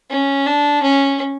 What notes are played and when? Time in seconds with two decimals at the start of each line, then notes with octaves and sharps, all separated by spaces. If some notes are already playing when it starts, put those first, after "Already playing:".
0.10 C#4
0.46 D4
0.82 C#4